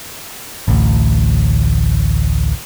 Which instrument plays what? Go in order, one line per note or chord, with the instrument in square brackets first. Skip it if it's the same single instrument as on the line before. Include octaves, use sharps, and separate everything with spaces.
[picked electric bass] A1 D2